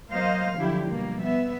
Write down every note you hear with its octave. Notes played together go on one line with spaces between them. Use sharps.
F#3 A#3 C5 D#5 F5
D3 F3 F#3 E4 G4
B2 F3 G3 A#3
B3 E5